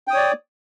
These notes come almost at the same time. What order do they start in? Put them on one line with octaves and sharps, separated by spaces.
G5 D#6 C#5 D5